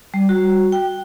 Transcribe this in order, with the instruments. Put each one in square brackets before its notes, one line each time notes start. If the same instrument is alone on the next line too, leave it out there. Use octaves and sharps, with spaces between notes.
[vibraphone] G3
F#4
G5